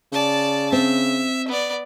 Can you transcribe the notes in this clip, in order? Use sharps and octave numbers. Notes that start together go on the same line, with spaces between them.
C#3 D5 A5
C4 E5
B3 D5